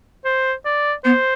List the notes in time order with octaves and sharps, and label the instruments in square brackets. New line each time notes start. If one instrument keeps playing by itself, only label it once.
[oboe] C5
D5
[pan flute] B3 [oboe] C5